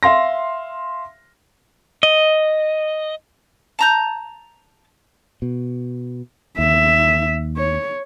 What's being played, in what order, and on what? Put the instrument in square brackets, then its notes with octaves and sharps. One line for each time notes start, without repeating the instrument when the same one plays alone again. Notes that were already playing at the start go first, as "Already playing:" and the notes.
[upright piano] E5 F5 C6 A#6
[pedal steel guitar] D#5
[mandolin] A5 A#5 G6
[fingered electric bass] B2
[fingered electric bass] D#2 [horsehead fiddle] E5
[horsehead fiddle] C#5